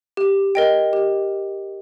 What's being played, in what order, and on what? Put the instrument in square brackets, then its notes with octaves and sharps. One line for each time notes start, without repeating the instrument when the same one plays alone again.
[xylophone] G4
A#4 D#5 G5
G4